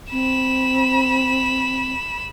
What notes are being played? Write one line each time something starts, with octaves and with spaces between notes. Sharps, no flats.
C4 B5 E7